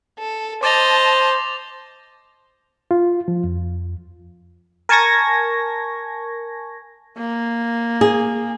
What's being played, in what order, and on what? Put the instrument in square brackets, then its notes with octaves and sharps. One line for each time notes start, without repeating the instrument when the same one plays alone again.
[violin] A4
[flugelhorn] C5 [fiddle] D#5 [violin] A5 [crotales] D6 A6 F7
[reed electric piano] F4
F3
F2
[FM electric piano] A#4 G#5 A5 C#6 G#6 A#6
[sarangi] A#3
[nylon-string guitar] G#4